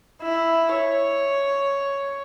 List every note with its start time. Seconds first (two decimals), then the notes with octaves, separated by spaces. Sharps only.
0.23 E4
0.75 C#5